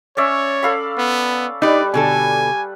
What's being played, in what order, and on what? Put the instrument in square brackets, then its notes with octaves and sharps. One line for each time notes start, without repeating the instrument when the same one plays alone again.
[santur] C#4 D5 E5 [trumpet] C#5
[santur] A4 F5 B5
[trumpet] B3
[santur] G3 B4 [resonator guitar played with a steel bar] D#4 [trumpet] D5
[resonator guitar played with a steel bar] B2 D3 A4 [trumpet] G#5